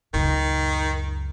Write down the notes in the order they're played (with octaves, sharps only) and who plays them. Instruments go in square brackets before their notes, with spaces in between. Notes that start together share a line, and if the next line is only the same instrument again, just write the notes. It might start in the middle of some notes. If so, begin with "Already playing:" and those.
[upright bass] C#2 F#2 [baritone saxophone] D#3